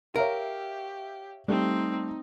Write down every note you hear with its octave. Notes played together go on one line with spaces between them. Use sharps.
G4 A#4 C#5 E5 F5
G3 A3 C4 D#4